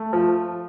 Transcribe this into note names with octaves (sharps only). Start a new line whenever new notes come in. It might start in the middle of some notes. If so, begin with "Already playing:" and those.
Already playing: A3
F3